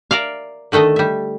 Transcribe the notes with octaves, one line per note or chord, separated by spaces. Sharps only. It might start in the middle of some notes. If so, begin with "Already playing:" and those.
A#4 D5 E5 F5
D3 D#3 A3 A4 D#5
G3 E5